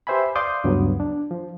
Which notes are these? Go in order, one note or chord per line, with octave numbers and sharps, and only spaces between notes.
G4 B4 C5 E5 G#5 B5
D5 F5 C6 D6 D#6 G6
D2 G2 C#3 F#3 B3
D4
F3